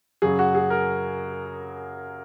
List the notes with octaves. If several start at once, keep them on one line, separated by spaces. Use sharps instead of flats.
F#2 C#3 F#3 G#4
F#4
G#4
A#4